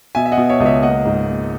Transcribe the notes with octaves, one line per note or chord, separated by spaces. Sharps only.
B2 E5 G#5
E5
D#5 F#5
B2
C#5 E5
C#2 D#5
C#5 E5
A#3 D#5 F#5
G#2
A#3